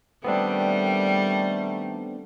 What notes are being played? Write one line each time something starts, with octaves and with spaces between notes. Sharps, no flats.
D#3 G3 A3 B3 C4 D4